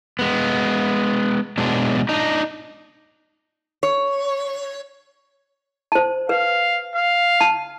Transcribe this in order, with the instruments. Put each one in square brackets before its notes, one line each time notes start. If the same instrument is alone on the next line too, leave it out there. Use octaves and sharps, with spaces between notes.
[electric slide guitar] G#3 B3
B2 F#3 G#3 D4
D4 D#4
[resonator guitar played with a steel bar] C#5
[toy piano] C5 A5
[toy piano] B4 [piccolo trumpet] F5
[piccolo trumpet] F5
[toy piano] A5